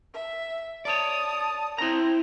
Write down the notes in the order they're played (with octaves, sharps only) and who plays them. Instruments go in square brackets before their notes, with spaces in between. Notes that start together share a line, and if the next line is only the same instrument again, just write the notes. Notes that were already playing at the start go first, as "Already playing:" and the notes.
[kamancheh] E5
[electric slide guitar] C#5 D5 [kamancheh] A5 D#6
[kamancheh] C4 [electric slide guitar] E4 A#5